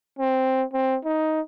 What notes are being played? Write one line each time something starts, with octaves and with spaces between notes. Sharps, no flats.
C4
C4
D#4